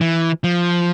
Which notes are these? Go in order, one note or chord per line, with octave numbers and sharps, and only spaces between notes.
E3
F3